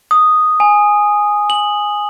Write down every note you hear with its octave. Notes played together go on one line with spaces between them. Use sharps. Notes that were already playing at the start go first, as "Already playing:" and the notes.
D#6
G#5
F#7